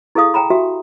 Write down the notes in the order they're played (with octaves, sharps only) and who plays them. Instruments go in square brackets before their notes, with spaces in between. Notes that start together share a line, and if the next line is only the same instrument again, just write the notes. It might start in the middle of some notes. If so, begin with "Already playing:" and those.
[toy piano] E4 G#4 A4 F5 D#6
G5 G#5 A#5 B5
F#4 G4 E5